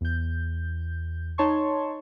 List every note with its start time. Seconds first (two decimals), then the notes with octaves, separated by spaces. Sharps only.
0.01 E2 G6
1.38 D#4 C#5 A5 C6 C#6